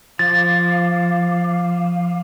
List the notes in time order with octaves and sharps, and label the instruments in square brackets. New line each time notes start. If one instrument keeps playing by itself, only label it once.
[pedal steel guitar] F3 [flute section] F5 D6 [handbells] A6